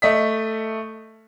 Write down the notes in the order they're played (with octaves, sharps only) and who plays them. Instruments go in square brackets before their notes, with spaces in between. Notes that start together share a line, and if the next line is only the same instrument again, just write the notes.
[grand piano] A3 D#5 B6